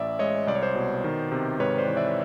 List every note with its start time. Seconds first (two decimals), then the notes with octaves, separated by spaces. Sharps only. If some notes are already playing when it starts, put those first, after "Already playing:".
Already playing: A1 D5 E5
0.19 G#3 C#5 D#5
0.47 C2 D5
0.55 C#5
0.63 C5 D5
0.75 B2
1.04 D#3
1.32 C3
1.59 G#2 B4 C#5
1.78 C5 D5
1.87 E3
1.97 D5 E5